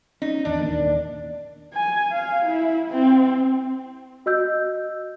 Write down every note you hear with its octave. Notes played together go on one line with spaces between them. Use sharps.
C#4 D#4
G#1 E2 D4
D#1 D#3 A#3
G#5
F5
E4
C4
F#4 D#5 E6 G6